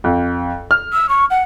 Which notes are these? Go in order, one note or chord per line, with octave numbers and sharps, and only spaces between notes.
F2
F6
E6
C#6
F#5